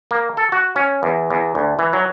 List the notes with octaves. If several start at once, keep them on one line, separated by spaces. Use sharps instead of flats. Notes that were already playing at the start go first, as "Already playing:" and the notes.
A#3
A4
F#4
C#4
E2
E2
D2
E3
F#3